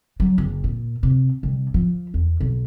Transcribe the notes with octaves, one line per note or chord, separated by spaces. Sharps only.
F#3
F#1
A#2
C3
C2
F3
E2
B1